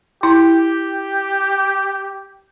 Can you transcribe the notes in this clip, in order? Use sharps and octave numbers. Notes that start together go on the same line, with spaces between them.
E4 G4